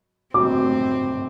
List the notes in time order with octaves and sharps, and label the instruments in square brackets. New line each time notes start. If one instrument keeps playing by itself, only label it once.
[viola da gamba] C4 [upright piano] D6